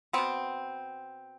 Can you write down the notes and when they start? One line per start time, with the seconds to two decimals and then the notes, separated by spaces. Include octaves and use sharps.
0.13 B2 B3 C4